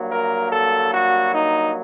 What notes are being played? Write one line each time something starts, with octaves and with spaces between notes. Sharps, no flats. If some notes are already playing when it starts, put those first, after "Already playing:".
Already playing: G2 F#3 A#3
A#4
A4
F#4
D#4